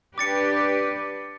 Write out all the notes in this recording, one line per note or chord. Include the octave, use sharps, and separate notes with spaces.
D4 G4 B4 D6 A6 C#7